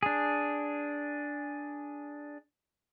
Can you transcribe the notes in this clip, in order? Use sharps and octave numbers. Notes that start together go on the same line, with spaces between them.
D4 G#4